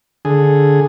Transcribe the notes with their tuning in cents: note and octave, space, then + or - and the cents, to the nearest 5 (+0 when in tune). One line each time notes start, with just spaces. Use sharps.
D3 +0 G#4 +0